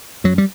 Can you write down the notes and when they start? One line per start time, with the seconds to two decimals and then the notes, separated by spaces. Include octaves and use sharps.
0.24 F#2 F#3
0.38 G3